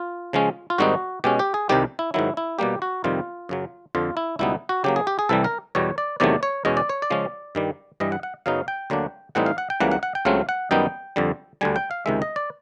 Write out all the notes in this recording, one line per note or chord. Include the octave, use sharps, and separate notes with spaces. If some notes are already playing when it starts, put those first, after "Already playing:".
Already playing: F4
C#3 F3 G#3 C#4
F4
G#2 D#3 G3 C4 D#4 F#4
B2 G#3 C#4 G4
G4
G#4
C2 C3 D#3 G3 G4
E4
G#2 D#3 F#3 E4
E4
B2 G3 A#3 G4
F#4
F2 C3 D#3 G3 F4
F#2 C#3 F#3
F2 D3 F3 F4
E4
C#2 B2 G3 B3 D#4 E4
F#4
C#3 F#3 A#3 G4
G#4
G4
G#4
C2 C3 E3 G3 A4
A#4
E2 B2 G3 C#5
D5
E2 C3 D#3 F#3 A3 D5
C#5
E2 B2 G#3 C#4 D#5
D5
C#5
D5
C#3 F3 G#3 C#4
G2 D#3 G3
G2 E3 G3 D#5
F#5
F#5
F#2 C#3 F#3 B3 D#4 F5
G5
D2 D3 F#3 A#3 D4
A2 E3 G3 C4 D#4 F#5
F5
F#5
G5
C#2 C#3 E3 G3 A#3 F#5
F#5
F#5
G5
C#2 C#3 F#3 A3 C4 F5
F#5
F#2 D#3 G3 B3 D#4 G5
F2 D3 G3
D2 D3 G3 G#5
G5
F5
C#2 C3 D#3 G#3 E5
D#5
D5